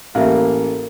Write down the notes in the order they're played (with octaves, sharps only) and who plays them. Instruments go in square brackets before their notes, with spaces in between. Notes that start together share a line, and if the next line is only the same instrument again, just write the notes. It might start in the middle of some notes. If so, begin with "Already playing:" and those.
[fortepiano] A1 [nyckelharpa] A#3 [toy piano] E5 F5